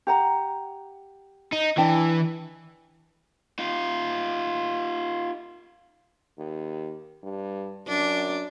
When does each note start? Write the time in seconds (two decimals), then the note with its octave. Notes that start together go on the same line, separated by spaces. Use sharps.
0.07 G4 F#5 A#5
1.53 D#4
1.78 E3 D4 D5 G5
3.59 D#4 F4
6.38 D#2
7.23 G2
7.88 F#2 D4